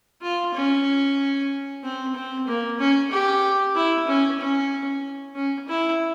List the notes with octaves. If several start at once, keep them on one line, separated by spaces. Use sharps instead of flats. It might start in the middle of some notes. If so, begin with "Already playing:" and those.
F4
C#4
C4
C4
A#3
C#4
G4
E4
C#4
C#4
C#4
E4